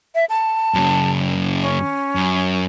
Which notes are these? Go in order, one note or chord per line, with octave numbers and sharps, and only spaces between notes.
E5
A5
F#2 C#3
C#4
F#2